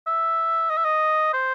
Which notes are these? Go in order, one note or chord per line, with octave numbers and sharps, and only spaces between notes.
E5
D#5
E5
D#5
C5